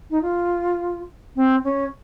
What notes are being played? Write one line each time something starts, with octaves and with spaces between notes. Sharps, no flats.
D#4
F4
C4
C#4